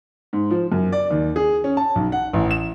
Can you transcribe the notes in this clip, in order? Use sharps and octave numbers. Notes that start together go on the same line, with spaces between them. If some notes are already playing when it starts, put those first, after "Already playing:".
G#2
F3
F#2
D5
D#2
G#4
C#4
A5
B1
F#5
A1
E7